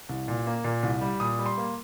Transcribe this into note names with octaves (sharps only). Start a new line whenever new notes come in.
C2
A#2
A#3
A#2
C2
G3
A#2 D#6
G3
C6
A#3